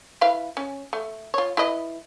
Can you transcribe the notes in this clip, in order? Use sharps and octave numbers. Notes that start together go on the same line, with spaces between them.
E4 B4 F5
C#4
A3
F4 C#5
E4 B4 D#5